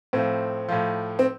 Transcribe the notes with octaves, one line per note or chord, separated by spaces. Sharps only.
A2 F3 C4
A2 F3
C4